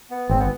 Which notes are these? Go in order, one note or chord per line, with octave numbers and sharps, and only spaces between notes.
B3
G#1 C4
B3